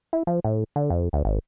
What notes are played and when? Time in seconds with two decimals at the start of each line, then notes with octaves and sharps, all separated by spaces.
0.13 E4
0.27 F3
0.44 A2
0.76 D3
0.90 F2
1.13 D2
1.25 G#1